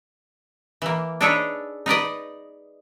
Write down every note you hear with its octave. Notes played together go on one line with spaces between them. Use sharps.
E3 A#3
D4 D#4 G#4 A4 B4 C#5
D#4 B4 D5 D#5